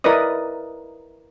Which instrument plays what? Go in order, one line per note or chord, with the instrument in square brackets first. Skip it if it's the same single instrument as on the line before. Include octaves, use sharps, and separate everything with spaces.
[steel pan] E4 A#4 B4 D5 D#5 D#6